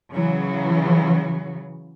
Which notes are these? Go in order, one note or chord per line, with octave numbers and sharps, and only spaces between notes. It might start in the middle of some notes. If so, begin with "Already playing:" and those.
C#3 E3 F#3